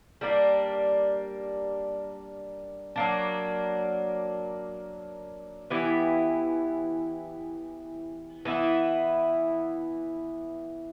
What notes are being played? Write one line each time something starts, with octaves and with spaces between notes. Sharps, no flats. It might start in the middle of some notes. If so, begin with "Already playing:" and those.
G3 A#3 D4
F#3 A#3 D4
E3 B3 E4 G4
E3 B3 E4